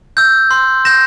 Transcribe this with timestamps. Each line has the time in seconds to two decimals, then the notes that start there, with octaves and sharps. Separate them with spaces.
0.17 E6 G6
0.51 C6
0.85 G6 A#6 E7